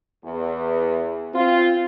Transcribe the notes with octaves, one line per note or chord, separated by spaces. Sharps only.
E2
C4 F4